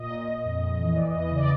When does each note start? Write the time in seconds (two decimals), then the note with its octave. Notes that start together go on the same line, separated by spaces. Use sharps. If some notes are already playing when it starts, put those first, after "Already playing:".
Already playing: A#2 D#5
0.11 A#2
0.28 A#2
0.45 F2
0.63 F2
0.80 E3
0.97 E3 D5
1.10 E2 D#5
1.23 D#5
1.31 C#3 D5